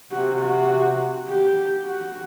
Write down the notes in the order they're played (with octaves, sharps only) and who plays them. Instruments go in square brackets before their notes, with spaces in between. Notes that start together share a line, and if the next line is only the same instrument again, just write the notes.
[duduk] C3 [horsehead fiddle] F#4
[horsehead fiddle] F#4
G4
F#4